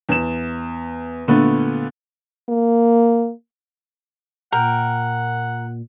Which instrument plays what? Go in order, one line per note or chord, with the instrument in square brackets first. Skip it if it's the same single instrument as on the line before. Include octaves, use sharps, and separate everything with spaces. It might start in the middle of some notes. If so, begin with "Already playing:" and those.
[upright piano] E2 E7
A#2 D3 A3 B3
[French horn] A#3
[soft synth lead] A#2 [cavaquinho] A#4 G5 [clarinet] F#5